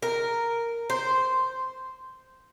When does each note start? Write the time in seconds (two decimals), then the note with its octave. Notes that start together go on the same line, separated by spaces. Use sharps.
0.02 A#4
0.90 C5